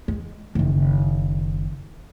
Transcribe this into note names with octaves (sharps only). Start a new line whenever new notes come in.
G#3
F#1 D#3